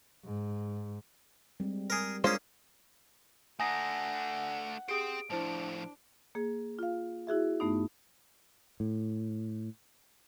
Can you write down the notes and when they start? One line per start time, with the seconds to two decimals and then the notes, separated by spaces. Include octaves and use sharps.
0.24 G#2
1.60 G3 G#3 C4
1.90 G#4 A#4
2.24 G#3 A#3 C#4 D4 F4 G#4 C5 D5
3.60 A3 D4 F#5 G#5 A#5 D#6 A#6
4.89 G4 G#4 C5 G5 D#6 D7
5.30 A2 F3 D4 E4 C5 A5
6.35 A#3 G#4
6.79 F4 F5
7.27 E4 F#4 G#4 E5
7.60 G2 A3 B3 D#4
8.80 A2